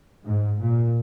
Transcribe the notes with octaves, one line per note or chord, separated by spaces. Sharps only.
G#2
A#2